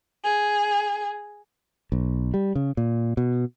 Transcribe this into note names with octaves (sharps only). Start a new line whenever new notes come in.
G#4
B1
G3
C#3
A#2
B2